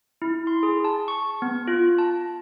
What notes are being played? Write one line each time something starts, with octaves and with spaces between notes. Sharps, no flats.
E4
C6
G#4
A5
C#6
B3
F4
A5